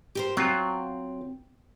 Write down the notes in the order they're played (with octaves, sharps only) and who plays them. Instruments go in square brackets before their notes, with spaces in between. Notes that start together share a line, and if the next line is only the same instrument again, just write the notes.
[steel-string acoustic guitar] G4 A#4 C5
[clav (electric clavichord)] F#3 F4 [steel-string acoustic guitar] C4